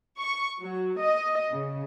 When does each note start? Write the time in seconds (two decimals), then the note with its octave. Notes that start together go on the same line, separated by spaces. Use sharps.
0.20 C#6
0.60 F#3
1.00 D#5
1.53 C#3